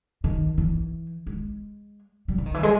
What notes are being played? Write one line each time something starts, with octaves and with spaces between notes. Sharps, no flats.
D#3
E3
G#3
G3
E3
D#3
E3
G#3